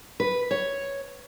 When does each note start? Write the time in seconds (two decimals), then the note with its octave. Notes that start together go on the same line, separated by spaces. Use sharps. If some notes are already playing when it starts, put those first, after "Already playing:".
0.20 B4
0.51 C#5